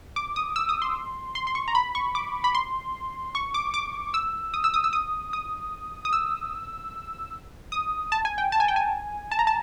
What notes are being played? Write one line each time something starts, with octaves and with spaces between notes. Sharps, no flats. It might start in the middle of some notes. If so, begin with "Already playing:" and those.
D6
D#6
E6
D#6
C6
C6
C6
C#6
A#5
B5
C#6
D6
B5
C6
C#6
D6
D6
E6
D#6
E6
D#6
E6
D#6
D#6
D#6
E6
D#6
A5
G#5
G5
A5
G#5
G5
G#5
A5
A#5
A5